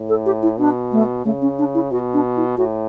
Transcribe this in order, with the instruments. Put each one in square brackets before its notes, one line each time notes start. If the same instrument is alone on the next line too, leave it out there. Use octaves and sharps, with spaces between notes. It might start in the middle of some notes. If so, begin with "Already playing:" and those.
Already playing: [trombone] A2
[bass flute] A4
G4
E4
[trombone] B2 [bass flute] D4
[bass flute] A3
[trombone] C#3 [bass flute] A3
[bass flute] C#4
D4
E4
[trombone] B2 [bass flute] F#4
[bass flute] D4
E4
[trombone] A2 [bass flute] F#4